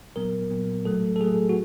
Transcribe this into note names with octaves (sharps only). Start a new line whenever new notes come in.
A#2 F#3 B3 A#4
A#2 F#3 B3
A2 F#3 A3 A4
A4
A2 F#3 A3 G#4
F#4